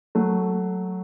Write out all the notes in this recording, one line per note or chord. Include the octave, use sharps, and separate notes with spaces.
F#3 A3